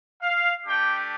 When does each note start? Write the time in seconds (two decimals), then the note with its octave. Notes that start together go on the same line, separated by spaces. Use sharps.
0.22 F5
0.65 A3 D4 G4 G5